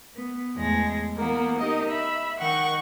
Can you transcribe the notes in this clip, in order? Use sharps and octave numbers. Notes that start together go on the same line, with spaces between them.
B3
E2 A2 G#3 A#6
E3 A#3 B3 A#4
D#4 G4 A#4 D#5
E5 B5
D#3 F#5 G5 C#6